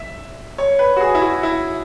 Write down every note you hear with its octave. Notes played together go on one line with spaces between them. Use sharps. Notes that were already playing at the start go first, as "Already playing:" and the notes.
Already playing: E5
C#5
B4
F#4
G#4
E4
F#4
E4